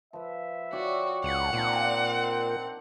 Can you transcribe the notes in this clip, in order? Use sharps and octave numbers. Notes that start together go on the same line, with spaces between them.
F3 B4 E5
F#4 C#5 D5 G5
C#2 F#5
A#2 C4 D4 D#4